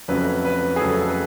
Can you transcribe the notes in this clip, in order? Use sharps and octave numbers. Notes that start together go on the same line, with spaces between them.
F2 C#3 F#3 A3 C#4 B4
B4
G#4
F2 C#3 F#3 A3 C#4 A4
B4